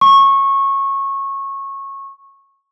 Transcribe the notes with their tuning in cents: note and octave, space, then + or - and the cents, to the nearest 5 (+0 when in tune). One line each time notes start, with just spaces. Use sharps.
C#6 -20